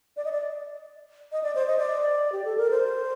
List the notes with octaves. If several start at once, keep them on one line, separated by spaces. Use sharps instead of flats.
D5
D#5
D5
D#5
D5
C5
D#5
D5
G4
A4
A#4
C5